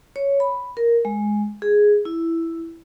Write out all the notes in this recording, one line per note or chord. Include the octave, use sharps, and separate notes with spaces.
C#5
B5
A#4
G#3
G#4
E4